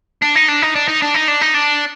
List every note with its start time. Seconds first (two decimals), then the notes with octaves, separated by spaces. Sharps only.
0.22 D4
0.36 D#4
0.49 D4
0.62 D#4
0.75 D4
0.88 D#4
1.02 D4
1.14 D#4
1.28 D4
1.41 D#4
1.54 D4